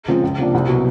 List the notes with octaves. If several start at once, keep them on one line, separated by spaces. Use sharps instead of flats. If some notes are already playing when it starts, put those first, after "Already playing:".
C#3 F3 G#3 C4
C#2
C3 F3 A#3 D4
C2
B2 F#3